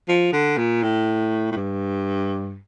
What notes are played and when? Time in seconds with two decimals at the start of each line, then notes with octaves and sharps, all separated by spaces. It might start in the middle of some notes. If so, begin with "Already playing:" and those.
0.09 F3
0.33 D3
0.58 A#2
0.83 A2
1.52 A2
1.56 G2